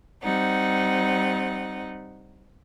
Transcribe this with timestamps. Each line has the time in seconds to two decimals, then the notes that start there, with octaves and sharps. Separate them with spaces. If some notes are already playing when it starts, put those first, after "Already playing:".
0.23 G3 C4 D#4 F#5